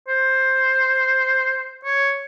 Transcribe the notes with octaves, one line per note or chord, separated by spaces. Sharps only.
C5
C#5